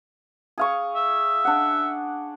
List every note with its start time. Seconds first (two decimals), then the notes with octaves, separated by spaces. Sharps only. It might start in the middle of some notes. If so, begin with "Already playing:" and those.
0.58 G#4 F5 C#6
0.95 E5
1.45 D4 F#5